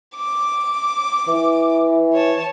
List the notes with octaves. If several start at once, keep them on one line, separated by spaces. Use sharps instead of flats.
D6
E3
C#5 A5